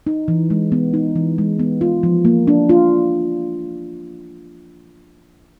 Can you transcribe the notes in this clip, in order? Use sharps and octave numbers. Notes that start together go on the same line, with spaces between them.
D#4
E3
G#3
B3
D#4
E3
G#3
B3
F4
F3
A#3
D4
F4